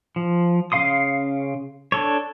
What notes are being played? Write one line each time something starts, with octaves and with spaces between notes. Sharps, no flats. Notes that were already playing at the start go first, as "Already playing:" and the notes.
F3
C#3 F5 C6 D#6
D4 A4 C#5